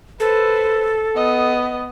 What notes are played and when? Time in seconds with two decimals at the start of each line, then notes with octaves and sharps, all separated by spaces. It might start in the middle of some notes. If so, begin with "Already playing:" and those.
0.20 A4 B4 C5
1.16 B3 D#5